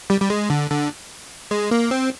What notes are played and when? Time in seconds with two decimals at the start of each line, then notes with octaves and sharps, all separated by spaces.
0.10 G3
0.21 G3
0.30 G#3
0.50 D3
0.71 D3
1.51 G#3
1.71 A#3
1.91 C4